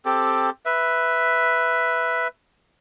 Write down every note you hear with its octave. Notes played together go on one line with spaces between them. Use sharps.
C4 G4 A4
B4 E5